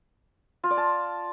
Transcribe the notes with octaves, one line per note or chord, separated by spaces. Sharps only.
F4
D5
A5